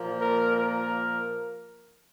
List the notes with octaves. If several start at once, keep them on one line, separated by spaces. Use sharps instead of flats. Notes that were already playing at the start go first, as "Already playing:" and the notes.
Already playing: A#2 F3 A#3
A#4
A#4